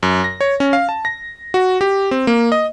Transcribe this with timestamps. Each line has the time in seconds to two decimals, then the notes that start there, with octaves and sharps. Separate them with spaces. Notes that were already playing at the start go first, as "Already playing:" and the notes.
0.03 F#2
0.24 A#6
0.41 C#5
0.60 C#4
0.73 F5
0.89 A5
1.05 A#6
1.54 F#4
1.81 G4
2.11 C4
2.27 A#3
2.52 D#5